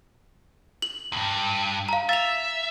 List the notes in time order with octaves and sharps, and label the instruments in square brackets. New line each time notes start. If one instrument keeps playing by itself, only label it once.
[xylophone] F#7
[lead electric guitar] E2 G2
[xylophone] F5 A#5
[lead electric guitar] E5 [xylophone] A6 F7